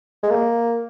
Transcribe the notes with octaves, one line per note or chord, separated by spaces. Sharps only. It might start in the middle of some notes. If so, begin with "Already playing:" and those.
G#3
A#3